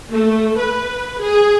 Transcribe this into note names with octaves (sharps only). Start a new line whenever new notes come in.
A3
B4
G#4